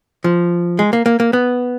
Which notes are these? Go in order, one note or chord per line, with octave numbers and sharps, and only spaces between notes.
F3
G#3
A#3
A#3
A#3
B3